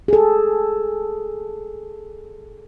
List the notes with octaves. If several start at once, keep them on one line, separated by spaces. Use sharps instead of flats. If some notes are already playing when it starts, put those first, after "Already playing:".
G#4 A4